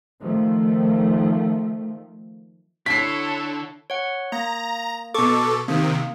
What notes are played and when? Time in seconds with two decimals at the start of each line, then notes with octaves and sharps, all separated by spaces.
0.22 D#3 F3 A3
2.86 D3 E4 A4 C#5 A5 B6 C7
3.90 C#5 F#5
4.32 A#3 A#5
5.14 B2 A4 C#6 D6
5.68 C3 D#3 A#3